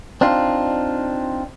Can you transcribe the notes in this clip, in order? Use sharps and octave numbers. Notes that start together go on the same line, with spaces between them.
C4 D4 D#4 F4